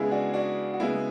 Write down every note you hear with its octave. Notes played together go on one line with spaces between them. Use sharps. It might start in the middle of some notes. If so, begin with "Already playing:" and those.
Already playing: C#3 G#3 B3 E4 G#4
D4 F#4
D4 F#4
F#4
C#3 G#3 B3 E4